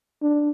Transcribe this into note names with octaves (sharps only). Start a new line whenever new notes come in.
D4